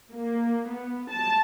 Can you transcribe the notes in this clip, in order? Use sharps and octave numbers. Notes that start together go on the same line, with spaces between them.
A#3
B3
A5